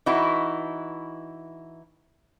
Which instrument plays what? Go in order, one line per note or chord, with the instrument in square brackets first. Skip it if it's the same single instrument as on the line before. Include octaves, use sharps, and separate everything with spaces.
[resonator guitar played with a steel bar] E3 D#4 E4 F#4